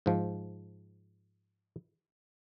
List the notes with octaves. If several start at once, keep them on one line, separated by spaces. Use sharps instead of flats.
G#2 F3